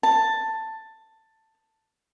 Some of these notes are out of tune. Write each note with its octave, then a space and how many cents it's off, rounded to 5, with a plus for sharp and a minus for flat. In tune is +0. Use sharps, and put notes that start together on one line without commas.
A5 +10